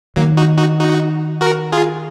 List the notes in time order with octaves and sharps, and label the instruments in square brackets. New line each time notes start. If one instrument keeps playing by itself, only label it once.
[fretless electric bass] D#3 [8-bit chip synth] F#3 A#3
[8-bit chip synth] D#4 F#4
D#4 F#4
D#4 F#4
F#4 A#4
F4 G#4